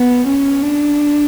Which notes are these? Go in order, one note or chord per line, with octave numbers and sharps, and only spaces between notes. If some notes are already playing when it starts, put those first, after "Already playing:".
Already playing: B3
C#4
D4